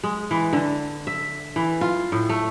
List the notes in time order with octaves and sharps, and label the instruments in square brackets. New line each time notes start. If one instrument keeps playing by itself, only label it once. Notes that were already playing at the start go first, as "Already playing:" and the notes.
[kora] G#3
E3
D3
E5
E3
F4
A2
A3